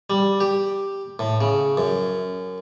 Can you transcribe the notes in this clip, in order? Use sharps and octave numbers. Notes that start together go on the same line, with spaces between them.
G3
G4
A2
C#3
F#2